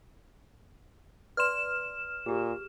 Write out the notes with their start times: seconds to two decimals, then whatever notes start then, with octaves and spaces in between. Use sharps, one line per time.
1.37 B4 D5 C6 F6 E7
2.26 A#2 G4 G#4